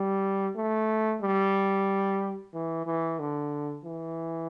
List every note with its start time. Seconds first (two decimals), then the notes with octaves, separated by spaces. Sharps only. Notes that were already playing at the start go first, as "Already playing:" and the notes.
Already playing: G3
0.56 A3
1.22 G3
2.54 E3
2.86 E3
3.19 D3
3.84 E3